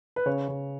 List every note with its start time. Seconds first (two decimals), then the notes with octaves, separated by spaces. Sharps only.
0.16 B4
0.26 C#3 C#5
0.48 C#3